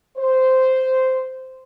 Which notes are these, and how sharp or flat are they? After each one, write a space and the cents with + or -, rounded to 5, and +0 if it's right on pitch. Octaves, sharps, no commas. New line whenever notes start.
C5 -10